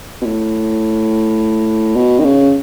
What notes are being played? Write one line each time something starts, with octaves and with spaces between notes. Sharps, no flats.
B2
A2
B2
D#3
C#3